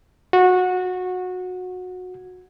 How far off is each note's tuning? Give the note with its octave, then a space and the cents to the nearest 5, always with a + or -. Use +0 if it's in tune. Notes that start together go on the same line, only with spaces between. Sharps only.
F#4 -20